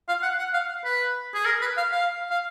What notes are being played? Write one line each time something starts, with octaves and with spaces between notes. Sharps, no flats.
F5
F#5
F#5
F5
B4
G#4
A#4
B4
F5
F5
F5